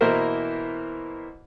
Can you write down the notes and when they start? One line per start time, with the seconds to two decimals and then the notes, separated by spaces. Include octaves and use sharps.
0.01 B2 E3 A#3 E4 A#4 C5